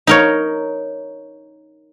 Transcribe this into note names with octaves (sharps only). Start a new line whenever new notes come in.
D#4 A#4 C#5